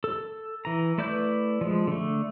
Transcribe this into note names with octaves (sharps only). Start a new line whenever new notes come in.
A4
E3 A#5
A3 E4 B4 D5 G6
F3 G#3
D3 A3